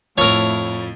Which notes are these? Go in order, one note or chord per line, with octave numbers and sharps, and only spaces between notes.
F2 A2 F3 E4 A#4 C#5